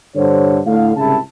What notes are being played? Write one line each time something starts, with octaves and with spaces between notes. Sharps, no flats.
G2 D3 C5 C#5
A2 D3 F5
C2 G#2 C#3 E4 A5